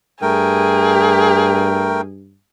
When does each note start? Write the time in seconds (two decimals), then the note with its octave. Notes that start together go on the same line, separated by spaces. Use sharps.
0.22 G2 A3 G#4 A#4 G5